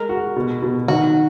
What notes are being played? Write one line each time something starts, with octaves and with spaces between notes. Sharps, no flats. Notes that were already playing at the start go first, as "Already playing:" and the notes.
Already playing: G#3 A#4
F#4
B2
B2
D#3 F#4